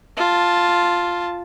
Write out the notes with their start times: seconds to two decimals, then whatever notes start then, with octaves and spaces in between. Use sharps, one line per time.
0.17 F4 A5